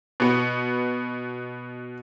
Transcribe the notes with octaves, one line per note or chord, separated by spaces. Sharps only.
B2 B3